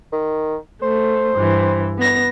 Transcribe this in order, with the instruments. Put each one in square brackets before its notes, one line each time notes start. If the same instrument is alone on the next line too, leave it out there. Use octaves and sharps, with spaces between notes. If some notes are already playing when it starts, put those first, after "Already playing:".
[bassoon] D#3
[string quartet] A3 [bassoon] C5
[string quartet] G2 E3
B3 A#6